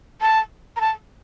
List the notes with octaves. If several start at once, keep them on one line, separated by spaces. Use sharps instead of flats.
A5
A#5
A5